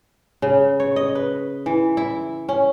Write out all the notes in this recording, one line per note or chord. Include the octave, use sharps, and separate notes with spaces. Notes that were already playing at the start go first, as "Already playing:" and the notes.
C#3
C#5
D#5
B4
E3
E4
C#4